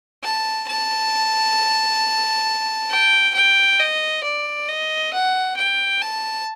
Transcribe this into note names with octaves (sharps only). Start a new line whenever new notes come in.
A5
A5
G5
G5
D#5
D5
D#5
F#5
G5
A5